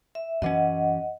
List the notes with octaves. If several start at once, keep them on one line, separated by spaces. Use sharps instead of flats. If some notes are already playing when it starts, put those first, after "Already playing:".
E5
F#2 E3 C#4 D#5 F#5